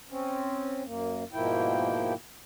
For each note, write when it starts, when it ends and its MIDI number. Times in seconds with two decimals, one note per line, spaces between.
0.10 0.83 60
0.10 0.83 61
0.85 1.24 42
0.85 1.24 58
1.33 2.13 44
1.33 2.13 47
1.33 2.13 53
1.33 2.13 58
1.33 2.13 64
1.33 2.13 79